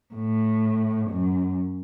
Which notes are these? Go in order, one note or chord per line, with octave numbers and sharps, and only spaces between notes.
A2
F#2